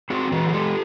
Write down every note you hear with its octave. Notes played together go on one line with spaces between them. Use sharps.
C4 F#4 G#4
E3 F#4 G#4
G#4
G#3 G4 A4